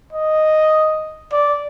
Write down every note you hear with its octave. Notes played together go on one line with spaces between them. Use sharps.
D#5
D5